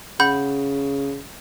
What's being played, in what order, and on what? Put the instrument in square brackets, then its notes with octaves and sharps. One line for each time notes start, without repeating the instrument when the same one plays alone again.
[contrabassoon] C#3 [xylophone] F#5 B5 G6